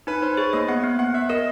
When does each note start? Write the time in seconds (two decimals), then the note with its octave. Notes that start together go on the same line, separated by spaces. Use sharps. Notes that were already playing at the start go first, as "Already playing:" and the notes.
0.07 D#4 B4
0.22 D#4 C5
0.37 G#4 C#5
0.53 A#3 D#5
0.68 B3 F#5
0.83 B3
0.99 B3 F#5
1.14 B3 E5
1.29 A#4 D#5